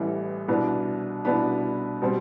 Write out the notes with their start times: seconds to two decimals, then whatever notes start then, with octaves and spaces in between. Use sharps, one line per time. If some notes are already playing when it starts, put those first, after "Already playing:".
Already playing: A1 A2 E3 G3
0.48 C2 B2 B3 D4
1.25 C2 B2 B3 D4 B5
2.02 B2 G3 C4